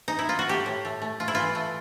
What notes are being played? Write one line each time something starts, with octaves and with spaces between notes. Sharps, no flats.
D#4
E4
F4
F#4
A3 G4
A2
A3
A3
A3 F4
E4
E3 F4
A3